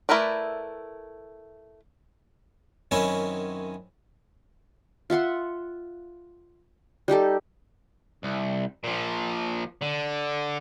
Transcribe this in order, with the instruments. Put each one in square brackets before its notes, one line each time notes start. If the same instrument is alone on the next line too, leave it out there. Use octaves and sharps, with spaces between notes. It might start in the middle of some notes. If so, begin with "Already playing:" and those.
[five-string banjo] A3 E4 A#4 B4 D5
[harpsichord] F#2 D#3 C4 C#4 E4 G#5
[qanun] F4 E5 F#5 C6
G3 D#4 G4 A4
[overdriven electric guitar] C2
A#2 F3
D3